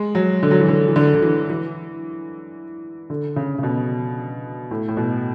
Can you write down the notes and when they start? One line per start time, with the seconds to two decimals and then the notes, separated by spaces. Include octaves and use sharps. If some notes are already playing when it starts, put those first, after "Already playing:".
Already playing: G#3
0.15 F#3
0.43 D3
0.51 F#3
0.60 E3
0.68 D3
0.88 E3
0.96 D3
1.15 D3
1.22 E3
1.49 E3
3.10 D3
3.36 C#3
3.59 C#3
3.63 B2
4.71 A2
4.88 A2
4.97 B2